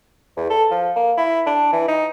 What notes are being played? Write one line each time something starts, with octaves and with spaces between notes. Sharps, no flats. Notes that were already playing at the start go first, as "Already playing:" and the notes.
E2
A4
F3
A#3
E4
D4
E3
D#4